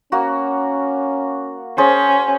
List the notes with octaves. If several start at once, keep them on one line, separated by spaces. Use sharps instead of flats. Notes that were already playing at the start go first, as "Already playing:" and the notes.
A#3 C#4 F#4
C#4 G#4 C5 A5